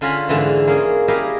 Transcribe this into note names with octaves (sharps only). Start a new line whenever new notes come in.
D3 C#4 F4 G#5 A#5 B5
G#2 D3 E3
A#3 C#4 G#4
E4 G4 G#4 A#4 D#5 F5